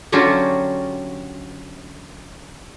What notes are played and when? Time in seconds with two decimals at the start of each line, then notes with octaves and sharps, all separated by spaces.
0.12 D3 F#3 C#4 F4 G4